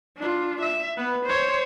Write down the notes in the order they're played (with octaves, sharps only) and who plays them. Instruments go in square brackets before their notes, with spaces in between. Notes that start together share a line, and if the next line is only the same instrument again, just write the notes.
[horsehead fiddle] D4 F4
E5
B3 B4
C5 C#5